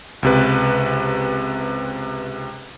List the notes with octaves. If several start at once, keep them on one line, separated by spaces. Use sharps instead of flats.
C#2 C3 B4